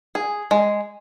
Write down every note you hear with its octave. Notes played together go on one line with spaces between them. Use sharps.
G#4
G#3